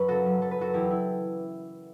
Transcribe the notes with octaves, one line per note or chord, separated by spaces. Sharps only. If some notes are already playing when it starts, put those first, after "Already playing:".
Already playing: F#2 B4 C#5
C#3 F#4 A4
F#2
F#2 A4
B4
F#2 F#4 A4
E2 E4 G4
E4